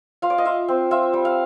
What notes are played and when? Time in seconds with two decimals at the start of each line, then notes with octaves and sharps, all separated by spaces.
0.22 F4 F5
0.30 D5
0.38 D#5
0.45 F4 E5
0.68 C4
0.91 F4 E5
1.13 G3
1.25 F5